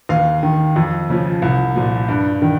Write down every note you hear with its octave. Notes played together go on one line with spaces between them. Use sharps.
D#2 F5
D#3
F2
C#3 F3
C2
A#2 F3
G2
D#3